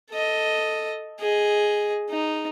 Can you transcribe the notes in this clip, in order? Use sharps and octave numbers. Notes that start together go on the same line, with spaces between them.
A4 D#5
G#4 D#5
D#4